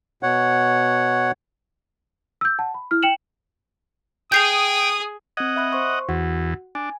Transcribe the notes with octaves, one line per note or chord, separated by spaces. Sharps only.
B2 C#5 F#5
E6 G6
F#5 A5
B5
E4 F6
G5 C#7 E7 F#7
G#4 G5 D#6 G6 C7 F7
C4 D#5 F#5 G#6
E5 B5 F#6
C5 C6 C#6
E2 F#4 F#5
D4 G#5